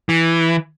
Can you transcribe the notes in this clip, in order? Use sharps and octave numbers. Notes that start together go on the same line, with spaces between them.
E3